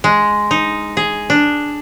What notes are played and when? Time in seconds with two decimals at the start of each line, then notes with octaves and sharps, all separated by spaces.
0.04 G#3
0.51 D#4
0.97 G#4
1.30 D4